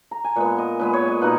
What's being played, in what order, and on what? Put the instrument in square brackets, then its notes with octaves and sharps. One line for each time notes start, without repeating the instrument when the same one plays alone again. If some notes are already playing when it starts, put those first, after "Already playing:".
[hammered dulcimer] A#5
G#5
A#2 G#3 B3 F#5
D#5
A#2 G#3 B3 B4
C#5
D#5
B2 A#3 D#4 F#5